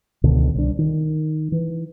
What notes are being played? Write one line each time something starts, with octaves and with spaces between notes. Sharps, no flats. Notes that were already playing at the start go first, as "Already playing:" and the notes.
C#2 B2 D3 D#3
C2 D4
D#3
E3